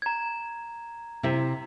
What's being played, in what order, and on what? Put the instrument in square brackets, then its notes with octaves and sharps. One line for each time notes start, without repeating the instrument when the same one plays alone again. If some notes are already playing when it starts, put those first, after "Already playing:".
[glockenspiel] A#5 G#6
[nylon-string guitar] C3 E4 E5